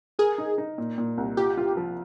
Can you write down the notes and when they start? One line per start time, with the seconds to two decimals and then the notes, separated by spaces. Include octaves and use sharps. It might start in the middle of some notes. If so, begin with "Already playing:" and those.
0.19 G#4 A#4
0.38 D#4
0.58 D#4
0.78 A#2
0.98 A#2
1.18 C2
1.37 F4 G4
1.57 F4
1.77 F3